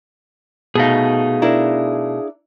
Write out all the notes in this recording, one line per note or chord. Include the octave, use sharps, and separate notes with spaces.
B2 A3 D#4 G#4 F5
D4 E4 A#4